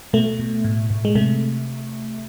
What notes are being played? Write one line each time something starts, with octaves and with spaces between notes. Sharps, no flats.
B2 A3
B2
A2
A2
G#3
C3 A3